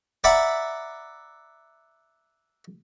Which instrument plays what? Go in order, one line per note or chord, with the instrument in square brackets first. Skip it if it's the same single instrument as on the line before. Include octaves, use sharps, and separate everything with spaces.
[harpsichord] D5 E5 F#5 A#5 B5